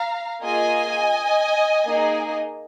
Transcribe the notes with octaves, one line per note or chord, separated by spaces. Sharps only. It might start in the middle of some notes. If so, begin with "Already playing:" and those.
Already playing: F5 A#5
A#3 F4 G#4 D#5 G#5
A#3 D#4 G#4